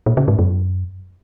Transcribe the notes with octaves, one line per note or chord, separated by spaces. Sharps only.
A#2
C#3
G#2
F#2